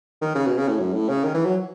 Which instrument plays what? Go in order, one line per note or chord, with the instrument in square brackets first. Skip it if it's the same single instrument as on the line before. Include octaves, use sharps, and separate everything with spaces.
[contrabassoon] D#3
C#3
B2
C#3
A2
F#2
A2
C#3
D#3
E3
F#3